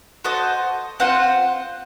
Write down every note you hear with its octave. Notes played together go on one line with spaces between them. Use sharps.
F#4 A4 C5 D#5
C4 F4 C5 F#5